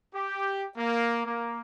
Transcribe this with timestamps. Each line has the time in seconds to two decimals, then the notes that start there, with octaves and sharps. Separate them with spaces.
0.15 G4
0.77 A#3
1.26 A#3